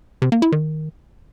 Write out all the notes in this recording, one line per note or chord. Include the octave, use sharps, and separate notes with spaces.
C3
A#3
E4
D#3